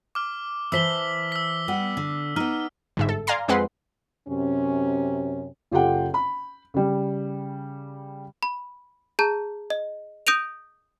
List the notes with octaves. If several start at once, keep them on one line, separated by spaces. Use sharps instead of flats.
D6 F6
E3 C5 A5 E6 B6 G7
E6 B6
G3 B3 F#5
D3
B3 D#4 F6
G1 G#2 E5
A4
D5 F5 G#5 A#5 C6
F2 G#3 C4 B4 F#5 C6
F#2 C3 C#4
F#1 F4 G4 A4 F#5 G5
B5
C#3 G3
B5
G#4 A5 A#5 G6
D#5
D#6 G6 A#6 D7 D#7 F7